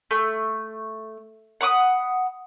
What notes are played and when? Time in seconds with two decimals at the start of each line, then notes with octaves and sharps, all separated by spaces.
0.11 A3
1.61 F#5 B5 D6 D#6